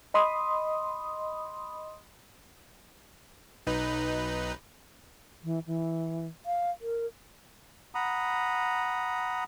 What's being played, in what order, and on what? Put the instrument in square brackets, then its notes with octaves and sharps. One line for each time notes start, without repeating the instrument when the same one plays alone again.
[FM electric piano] D#5 B5 C6 D#6
[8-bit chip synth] B1 D#4 B4
[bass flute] E3
E3
F5
A#4
[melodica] F#5 A#5 B5 D#6